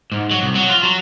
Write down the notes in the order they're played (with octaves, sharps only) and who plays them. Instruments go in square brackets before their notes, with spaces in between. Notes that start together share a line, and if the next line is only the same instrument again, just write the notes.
[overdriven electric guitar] G#2
F#3
C2
F#3
F4
F#3